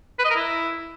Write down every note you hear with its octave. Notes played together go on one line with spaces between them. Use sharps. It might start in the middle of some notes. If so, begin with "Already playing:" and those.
B4
D#5
A#4
E4